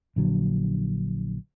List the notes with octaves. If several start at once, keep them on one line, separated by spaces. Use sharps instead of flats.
A#1 D3 F#3